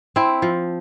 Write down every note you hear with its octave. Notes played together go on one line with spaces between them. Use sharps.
C4 E4
F3